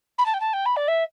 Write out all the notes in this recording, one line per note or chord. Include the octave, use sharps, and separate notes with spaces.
B5
A5
G5
A5
G5
B5
D5
E5